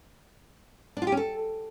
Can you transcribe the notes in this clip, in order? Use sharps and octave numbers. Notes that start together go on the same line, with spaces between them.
D4
F4
G4
C#4
A4